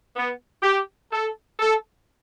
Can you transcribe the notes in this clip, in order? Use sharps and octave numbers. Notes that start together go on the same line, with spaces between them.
B3
G4
A4
A4